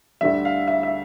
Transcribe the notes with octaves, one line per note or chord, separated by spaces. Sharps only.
D2 D3 G3 E5
F5
E5
E5